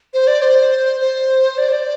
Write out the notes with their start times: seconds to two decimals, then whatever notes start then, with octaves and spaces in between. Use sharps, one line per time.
0.14 C5
0.27 D5
0.42 C5
1.01 C5
1.58 D5
1.69 C5
1.73 D5